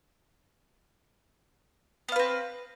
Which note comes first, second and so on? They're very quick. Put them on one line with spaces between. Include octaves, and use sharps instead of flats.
B3 F5 B4 C4